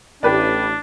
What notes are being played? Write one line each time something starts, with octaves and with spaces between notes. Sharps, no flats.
A1 D4 G4 B4 D5